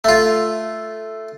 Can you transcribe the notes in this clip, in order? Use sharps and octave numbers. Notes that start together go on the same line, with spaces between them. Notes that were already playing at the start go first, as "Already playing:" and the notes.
A3 F4